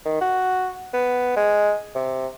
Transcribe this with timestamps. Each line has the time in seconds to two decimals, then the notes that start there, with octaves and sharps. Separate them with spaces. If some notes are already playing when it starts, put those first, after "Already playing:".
0.05 D#3
0.21 F#4
0.93 B3
1.36 G#3
1.95 C3